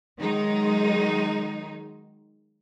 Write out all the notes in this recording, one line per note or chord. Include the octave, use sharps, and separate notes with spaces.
D#3 F#3 G#3 D#4